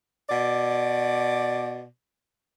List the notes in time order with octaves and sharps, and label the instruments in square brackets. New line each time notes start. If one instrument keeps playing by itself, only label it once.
[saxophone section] B2 D5